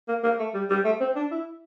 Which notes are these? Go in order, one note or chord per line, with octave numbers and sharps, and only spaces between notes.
A#3
A#3
A3
G3
G3
A3
C4
D4
E4